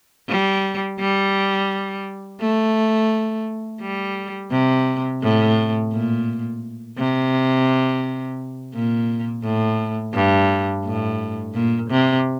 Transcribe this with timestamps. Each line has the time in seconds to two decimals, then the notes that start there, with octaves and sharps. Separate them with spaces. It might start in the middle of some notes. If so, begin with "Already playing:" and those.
0.29 G3
1.00 G3
2.41 A3
3.81 G3
4.51 C3
5.22 A2
5.93 A#2
6.98 C3
8.74 A#2
9.44 A2
10.15 G2
10.85 A2
11.54 A#2
11.91 C3